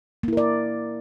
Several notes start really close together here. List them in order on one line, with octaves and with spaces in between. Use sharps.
A#3 E4 A#4 D5